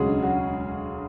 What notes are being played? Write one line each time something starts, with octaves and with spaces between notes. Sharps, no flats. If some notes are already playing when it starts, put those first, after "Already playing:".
Already playing: E1 D2 C#3 F#3 G#3 G#4
F#3 F#4